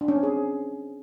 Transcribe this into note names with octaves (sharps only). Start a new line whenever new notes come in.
D4
C#4
C4
G#4